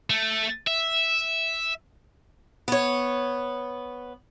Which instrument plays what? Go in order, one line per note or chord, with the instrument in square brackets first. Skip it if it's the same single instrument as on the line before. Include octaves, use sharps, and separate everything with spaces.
[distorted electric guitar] A3
E5
[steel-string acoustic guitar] B3 C#5